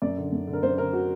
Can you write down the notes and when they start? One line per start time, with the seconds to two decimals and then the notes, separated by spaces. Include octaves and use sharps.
0.02 F#2 D5
0.17 D3
0.32 F#2
0.48 D3
0.53 A#4
0.63 F#2 C5
0.78 D3 A#4
0.93 F#4